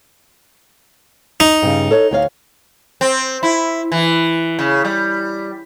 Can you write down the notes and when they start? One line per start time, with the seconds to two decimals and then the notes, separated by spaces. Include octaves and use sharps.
1.40 D#4
1.62 G2 C#3
1.91 A4 C#5
2.11 D2 C#5 F5
3.01 C4
3.43 E4
3.92 E3
4.59 C#3
4.85 G3